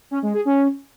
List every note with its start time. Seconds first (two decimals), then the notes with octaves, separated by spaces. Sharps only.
0.11 C#4
0.22 G#3
0.34 G#4
0.45 C#4